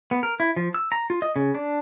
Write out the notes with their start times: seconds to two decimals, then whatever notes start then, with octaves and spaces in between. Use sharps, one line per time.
0.11 B3
0.23 A#4
0.40 E4
0.56 F3
0.74 E6
0.92 A#5
1.10 F4
1.22 D#5
1.36 C#3
1.54 D4